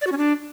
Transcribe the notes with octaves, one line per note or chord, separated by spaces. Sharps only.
D5
F#4
C#4
D4